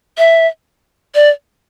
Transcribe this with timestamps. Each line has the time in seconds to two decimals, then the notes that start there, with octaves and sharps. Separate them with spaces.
0.18 E5
1.15 D5